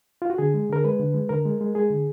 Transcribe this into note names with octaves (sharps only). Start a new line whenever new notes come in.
F4
F#4
D3 G#4
G#3
D3 A#4
G#3 B4
D3
G#3
D3 A#4
G#3
G#3
G#3 G#4
D3